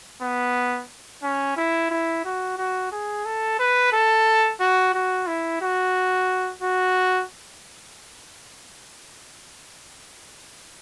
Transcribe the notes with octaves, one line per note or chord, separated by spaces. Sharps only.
B3
C#4
E4
E4
F#4
F#4
G#4
A4
B4
A4
F#4
F#4
E4
F#4
F#4